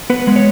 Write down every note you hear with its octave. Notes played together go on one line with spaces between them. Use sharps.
B3 B4
G#3
C#5